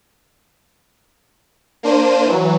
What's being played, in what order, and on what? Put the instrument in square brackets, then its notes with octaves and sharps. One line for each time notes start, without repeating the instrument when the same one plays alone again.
[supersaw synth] A#3 D4 C5 D#7
E3 F#3